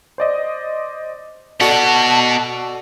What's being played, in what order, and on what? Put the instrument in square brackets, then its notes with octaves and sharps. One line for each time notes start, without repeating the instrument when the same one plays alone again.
[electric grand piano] C5 D5 D#5
[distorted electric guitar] B2 F#5 [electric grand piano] F#4 A4 D5 [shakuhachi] A5